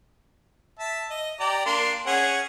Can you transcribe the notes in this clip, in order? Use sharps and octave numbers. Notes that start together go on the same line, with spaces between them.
E5 A5
D#5
G4 D5 A#5
A#3 D4 C6
C#4 G#4 F#5